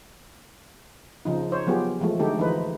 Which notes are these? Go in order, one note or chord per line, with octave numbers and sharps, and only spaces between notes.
C#3 F3 D#4
D#4 C5 C#5
F3 F#3 B3 F4 G4 G#4
E3 F3 G#3 A3
D3 G#3 A3 D#4 G4 A4
E3 F3 D#4 B4 C5